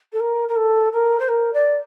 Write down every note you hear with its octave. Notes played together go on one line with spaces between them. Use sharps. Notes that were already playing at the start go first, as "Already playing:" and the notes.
A4
A#4
A#4
A4
A#4
C5
A#4
D5